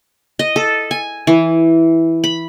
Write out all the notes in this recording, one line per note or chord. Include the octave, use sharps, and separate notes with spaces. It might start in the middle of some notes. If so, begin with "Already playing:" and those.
D#5
A4
G#5
E3
B5